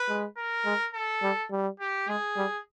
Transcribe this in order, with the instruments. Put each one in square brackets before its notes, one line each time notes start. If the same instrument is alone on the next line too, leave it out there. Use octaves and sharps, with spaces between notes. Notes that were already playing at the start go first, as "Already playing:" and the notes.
Already playing: [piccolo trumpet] B4
[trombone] G#3
[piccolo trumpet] A#4
[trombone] G#3
[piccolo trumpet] A4
[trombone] G3
G3
[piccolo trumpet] G4
[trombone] G#3 [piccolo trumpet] G#4
[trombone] G3